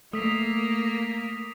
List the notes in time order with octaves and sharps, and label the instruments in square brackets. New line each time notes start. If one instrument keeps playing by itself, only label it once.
[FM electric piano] A3 [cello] A#3 [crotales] D#6 B6 F7